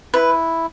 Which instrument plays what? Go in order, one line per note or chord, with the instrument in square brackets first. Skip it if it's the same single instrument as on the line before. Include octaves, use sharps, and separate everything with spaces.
[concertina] E4 [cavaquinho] B4